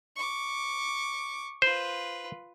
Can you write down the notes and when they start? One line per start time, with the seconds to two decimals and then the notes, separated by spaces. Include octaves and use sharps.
0.16 C#6 D6
1.62 F4 B4 C5